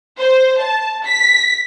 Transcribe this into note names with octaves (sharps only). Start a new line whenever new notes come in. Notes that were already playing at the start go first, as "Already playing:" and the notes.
C5
A5
B6